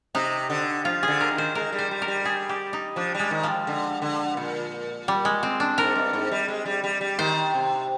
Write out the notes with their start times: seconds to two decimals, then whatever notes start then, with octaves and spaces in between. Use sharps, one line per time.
0.15 C3 D#4
0.50 D3
0.85 F3 F4
1.03 G#4
1.08 D3
1.21 A#4
1.31 D#3
1.38 C5
1.55 G#3 A#4
1.72 G3
1.79 C5
1.91 G3
2.02 A#4
2.08 G3
2.25 G#4
2.49 G4
2.73 D#4
2.96 F3 D4
3.14 G3 G#3
3.31 D#3
3.43 F3
3.67 D3
4.02 D3
4.37 A#2
5.08 G3
5.25 G#3
5.43 C4
5.60 D4
5.78 G#2 A#4
5.95 G2
6.13 G#2
6.32 G3
6.48 G#3
6.66 G3
6.84 G3
7.01 G3
7.19 D#3 C5
7.54 C3